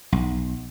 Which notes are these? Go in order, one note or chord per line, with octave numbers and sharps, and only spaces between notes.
B1